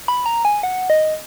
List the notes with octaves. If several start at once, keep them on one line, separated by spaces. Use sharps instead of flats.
B5
A#5
G#5
F#5
D#5